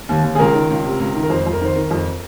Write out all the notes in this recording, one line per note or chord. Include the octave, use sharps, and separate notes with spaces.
D#2
D#2
G#4
C#2 A#4
D#3
C#2
C3
C#2
D#3
A#4
F2 C5
F2 C5
A#4
D#3 C5
D#3 A#4
F2